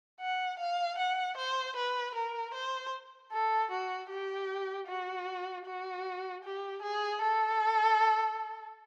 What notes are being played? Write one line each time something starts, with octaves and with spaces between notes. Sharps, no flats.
F#5
F5
F#5
C5
B4
A#4
C5
A4
F#4
G4
F#4
F#4
G4
G#4
A4